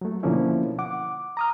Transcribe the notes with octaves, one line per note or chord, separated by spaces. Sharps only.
F#3 A3
B2 D3 F3 A#3 C#4 E4
F#5 D6
A#5 D#6 F6